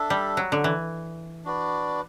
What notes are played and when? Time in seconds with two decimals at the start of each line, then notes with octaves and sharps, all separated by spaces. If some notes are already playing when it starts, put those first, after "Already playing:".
Already playing: D4 A4 E5
0.10 G3
0.37 F#3
0.52 D3
0.64 E3
1.45 D4 F#4 B4 D5